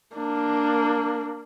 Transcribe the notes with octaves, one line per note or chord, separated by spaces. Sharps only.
A#3 D4